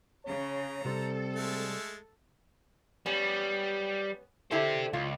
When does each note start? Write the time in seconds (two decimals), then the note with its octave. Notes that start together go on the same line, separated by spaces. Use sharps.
0.25 C#3 C#5 A#5
0.85 C3 G3 C4 A4 C5
1.36 G#3 A3 E6
3.06 G3 B3 C#4
4.51 D3 E4 G4 A4 C5
4.93 C#2 F4